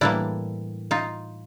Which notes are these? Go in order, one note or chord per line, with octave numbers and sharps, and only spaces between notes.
A2 E3 G3 A#3 D4 E4
D#4 F4